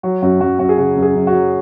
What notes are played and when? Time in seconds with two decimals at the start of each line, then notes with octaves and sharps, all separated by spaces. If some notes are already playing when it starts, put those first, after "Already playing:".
0.03 F#3 F#4
0.22 F#2 F#4
0.41 F#2 F#4
0.59 F#2 F#4
0.69 G#4
0.78 C#3 F#4
0.96 F#2
1.02 G#4
1.15 F#2
1.27 F#4
1.34 F#3